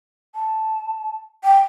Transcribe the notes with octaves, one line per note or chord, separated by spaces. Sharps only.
A5
G5